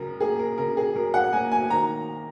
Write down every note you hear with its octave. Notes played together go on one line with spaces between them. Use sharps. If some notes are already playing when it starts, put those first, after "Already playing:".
Already playing: F#2 C#3 A#4
A#3 G#4
A#4
C#3 A#4
G#4
F#2 A#4
F#5
A#3 G#5
G#5
D#3 A#5